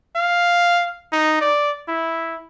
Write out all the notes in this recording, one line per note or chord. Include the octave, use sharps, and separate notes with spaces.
F5
D#4
D5
E4